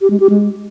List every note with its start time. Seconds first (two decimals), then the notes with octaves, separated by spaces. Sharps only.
0.01 G4
0.10 G#3
0.20 G4
0.30 G#3